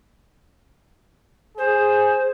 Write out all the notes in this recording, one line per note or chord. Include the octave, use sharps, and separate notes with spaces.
G#4 C5